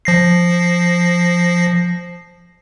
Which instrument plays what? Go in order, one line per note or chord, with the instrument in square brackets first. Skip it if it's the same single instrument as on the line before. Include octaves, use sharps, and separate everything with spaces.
[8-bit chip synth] F3 A#6 C7